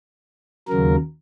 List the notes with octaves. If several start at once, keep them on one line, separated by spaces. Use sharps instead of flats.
D#2 C#3 F#3 A#4